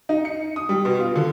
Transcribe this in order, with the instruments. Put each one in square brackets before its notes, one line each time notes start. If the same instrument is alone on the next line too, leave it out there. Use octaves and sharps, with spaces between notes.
[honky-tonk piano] D#4
C#7
D#6
G3
B2
F4
D3